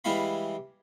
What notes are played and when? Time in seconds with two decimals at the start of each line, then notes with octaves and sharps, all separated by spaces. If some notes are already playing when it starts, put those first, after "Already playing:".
0.04 E3 G3 G#3 E4 F5 B5